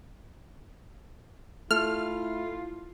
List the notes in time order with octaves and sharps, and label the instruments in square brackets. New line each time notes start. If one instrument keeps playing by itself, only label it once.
[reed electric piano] A3 A4 [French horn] E4 [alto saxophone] F4 [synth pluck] F6